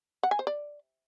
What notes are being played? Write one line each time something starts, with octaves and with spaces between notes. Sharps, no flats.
F#5
G#5
C5
D5